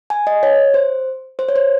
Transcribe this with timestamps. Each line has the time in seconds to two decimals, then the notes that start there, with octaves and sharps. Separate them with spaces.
0.10 G#5
0.27 D#5
0.43 C#5
0.74 C5
1.39 C5
1.49 C#5
1.56 C5